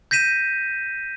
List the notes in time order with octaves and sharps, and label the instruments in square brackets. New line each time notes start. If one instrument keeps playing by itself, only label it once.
[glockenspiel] G6 A#6 B6 D#7 E7